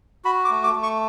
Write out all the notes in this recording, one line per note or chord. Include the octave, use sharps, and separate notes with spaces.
F#4 B5
D6
A3
D6
A3
C#6